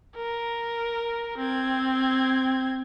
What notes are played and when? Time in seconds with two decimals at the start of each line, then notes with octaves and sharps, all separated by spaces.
0.16 A#4
1.38 C4 G#6